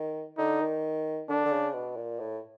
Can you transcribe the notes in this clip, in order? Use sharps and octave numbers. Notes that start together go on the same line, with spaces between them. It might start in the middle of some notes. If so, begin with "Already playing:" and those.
Already playing: D#3
D3 D#4
D#3
D3 D4
D3
C#3
B2
A#2
A2